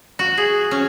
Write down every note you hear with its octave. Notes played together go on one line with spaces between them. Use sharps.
F#4
G#4
C#4